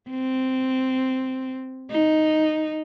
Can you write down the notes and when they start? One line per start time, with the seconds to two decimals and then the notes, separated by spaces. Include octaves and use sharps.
0.10 C4
1.91 D#4